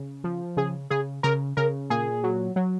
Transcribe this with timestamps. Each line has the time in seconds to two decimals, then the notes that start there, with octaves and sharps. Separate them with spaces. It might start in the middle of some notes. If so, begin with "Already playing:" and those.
Already playing: C#3
0.24 F3
0.57 C#3 G#4
0.90 C#3 G#4
1.23 C#3 A#4
1.57 C#3 A#4
1.90 A#2 G#4
2.24 F#3
2.56 F#3